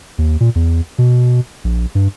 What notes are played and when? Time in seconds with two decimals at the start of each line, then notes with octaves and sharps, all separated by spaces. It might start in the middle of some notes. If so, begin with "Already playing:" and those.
0.18 D#2
0.40 A#2
0.55 E2
0.98 B2
1.64 A#1
1.95 G2